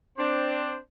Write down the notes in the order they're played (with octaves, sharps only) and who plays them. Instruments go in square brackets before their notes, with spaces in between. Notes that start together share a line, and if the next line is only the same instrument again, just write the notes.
[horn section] C4 D4 C5